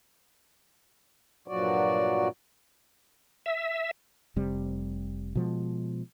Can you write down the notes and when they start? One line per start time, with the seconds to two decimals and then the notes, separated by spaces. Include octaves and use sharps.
1.48 G2 A#2 F3 F#3 F#4 D5
3.46 E5
4.36 F1 C3 G3
5.35 B2 F3 G#3